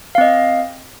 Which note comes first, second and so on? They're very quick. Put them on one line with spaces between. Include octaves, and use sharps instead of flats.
F5 C4 D#5